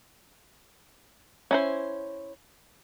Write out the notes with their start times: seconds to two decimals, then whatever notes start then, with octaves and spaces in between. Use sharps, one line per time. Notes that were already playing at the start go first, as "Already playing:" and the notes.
1.51 C#4 E4 C5